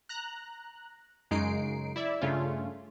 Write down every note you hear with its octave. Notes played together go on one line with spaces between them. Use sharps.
A#5 F#6
F#2 C#3 G#3 D#4 C7 D7
E4 D5 E5
G2 C#3 A3 C#4 F4